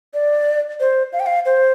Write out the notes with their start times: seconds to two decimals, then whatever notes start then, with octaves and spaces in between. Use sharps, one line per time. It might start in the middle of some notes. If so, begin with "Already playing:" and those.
0.14 D5
0.80 C5
1.13 F5
1.20 G5
1.26 F5
1.46 C5